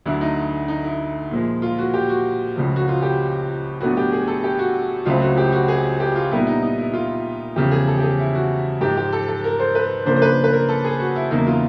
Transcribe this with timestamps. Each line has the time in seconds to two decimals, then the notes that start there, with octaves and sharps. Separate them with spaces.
0.06 D2 D3 F#3 E4
0.21 D#4
0.68 D#4
0.84 E4
1.31 A#2 F3 G#3
1.62 F4
1.78 F#4
1.94 G4
2.09 F#4
2.56 C#2 C#3 F3
2.76 F#4
2.88 F4
3.02 G4
3.81 A2 F#3 B3 D4 F#4
3.97 G4
4.12 G#4
4.27 A4
4.44 G4
4.59 F#4
5.05 C#2 C#3 F#3 A3 C4 F4
5.22 F#4
5.38 G4
5.52 F#4
5.68 G#4
6.00 G4
6.16 F4
6.32 A#2 G3 B3 D#4 E4
6.47 D#4
6.62 D#4
6.78 E4
6.94 F4
7.56 E2 C#3 F3 A3 G4
7.71 G#4
7.87 A4
7.98 G4
8.03 G#4
8.19 E4
8.35 F#4
8.81 G#2 F3 G#3 G4
8.97 G4
9.12 A4
9.28 A4
9.44 A#4
9.60 C5
9.75 B4
10.06 C#3 F3 A#3 D4 C5
10.16 C5
10.22 B4
10.44 B4
10.53 A#4
10.69 A4
10.84 G#4
11.00 F#4
11.16 E4
11.31 E2 C#3 F#3 A#3 D#4 E4
11.47 F4